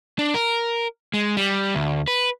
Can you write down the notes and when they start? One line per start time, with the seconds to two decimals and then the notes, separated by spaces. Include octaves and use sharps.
0.19 D4
0.34 A#4
1.14 G#3
1.37 G3
1.75 D2
2.08 B4